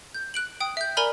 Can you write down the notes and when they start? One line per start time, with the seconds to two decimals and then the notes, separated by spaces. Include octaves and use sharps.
0.14 G6
0.34 F#6 D7 F#7
0.61 G5 D#6
0.77 E5 G6
0.97 A#4 D5 G#5 A#5 B5 F6